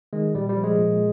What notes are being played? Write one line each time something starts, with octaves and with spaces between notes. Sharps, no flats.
D#3 G#3
A#2 G3
G3
F3
G#3
A#2